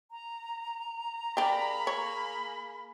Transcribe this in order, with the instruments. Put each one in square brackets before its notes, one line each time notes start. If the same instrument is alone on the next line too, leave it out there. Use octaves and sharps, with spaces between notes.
[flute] A#5
[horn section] A#3 G#4 B5 [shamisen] D4 G4
[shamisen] C#5